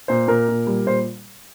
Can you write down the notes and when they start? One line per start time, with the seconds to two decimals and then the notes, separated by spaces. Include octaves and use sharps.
0.08 A#2 C5
0.28 A#2 A#4
0.48 A#2
0.67 G3
0.86 A#2 C5